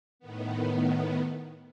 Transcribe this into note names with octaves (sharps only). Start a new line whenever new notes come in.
A2 D#3 B3